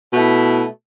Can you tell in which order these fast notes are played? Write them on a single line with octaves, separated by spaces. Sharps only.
B2 A3 E4